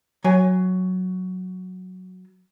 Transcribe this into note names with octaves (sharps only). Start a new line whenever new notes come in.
F#3 G#5